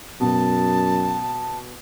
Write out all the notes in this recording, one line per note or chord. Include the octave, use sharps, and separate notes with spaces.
F#2 B2 A5